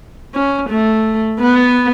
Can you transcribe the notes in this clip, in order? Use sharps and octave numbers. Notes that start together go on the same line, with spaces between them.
C#4
A3
B3